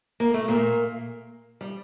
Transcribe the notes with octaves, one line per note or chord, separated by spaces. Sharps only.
A#3
A3
A#2 A#3
G3